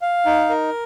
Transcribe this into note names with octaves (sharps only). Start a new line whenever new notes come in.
F5
D#4
A#4